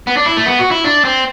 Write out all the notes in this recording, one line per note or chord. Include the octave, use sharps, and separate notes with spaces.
B3
D4
E4
A3
B3
F#4
E4
D4
C4